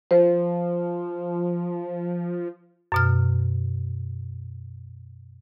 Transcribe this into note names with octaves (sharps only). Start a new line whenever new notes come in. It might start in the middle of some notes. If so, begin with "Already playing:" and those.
F3 C5
F#2 B2 F6